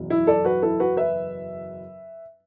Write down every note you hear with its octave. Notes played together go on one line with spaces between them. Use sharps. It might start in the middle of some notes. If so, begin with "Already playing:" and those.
Already playing: F#1 E2 B2
E4
A4 D5
F#4 B4
E4 A4
F#4 B4
B4 E5